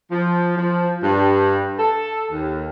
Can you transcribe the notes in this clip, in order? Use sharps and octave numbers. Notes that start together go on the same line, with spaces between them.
F3
F3
G2
A4
D#2